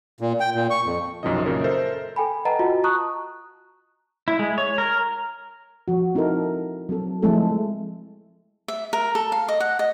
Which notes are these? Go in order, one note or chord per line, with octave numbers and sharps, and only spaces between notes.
A#2
G5
A#2
C#6
F2
B1 F#2 C3 D#3 F3 D#5
F#2 A#2 C#3 A#4 D#5
A4 A#4 C5 E5
A4 G5 G#5 B5
B4 D#5 F#5 G5 A5 A#5
F4 F#4 D#5
A5 A#5 C#6 D#6 F#6
E4
G#3
C#5
A#4
F3 F#4
C4 D#4 E4 A4 A#4
F#3 C4 A4
F3 G#3 A3 C4 E4 A4
E5
A#4
A4
F5
D#5
F#5
D#5